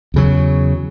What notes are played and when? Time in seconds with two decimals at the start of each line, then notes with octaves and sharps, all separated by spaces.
0.14 E2 C#3 F#3